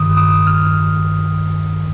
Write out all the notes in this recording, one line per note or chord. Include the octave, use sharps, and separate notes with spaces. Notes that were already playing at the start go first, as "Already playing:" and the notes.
Already playing: G2 D#3 D#6
D#6
F6